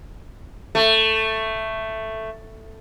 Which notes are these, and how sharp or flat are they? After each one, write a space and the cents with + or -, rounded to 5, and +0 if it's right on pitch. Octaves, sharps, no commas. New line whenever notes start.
A3 +5